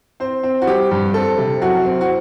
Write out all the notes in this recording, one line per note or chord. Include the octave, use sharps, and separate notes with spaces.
C4 C5
C4
F#4
G3 G4
G2
C4 A4
C3
F#2 F#4
C4
F#4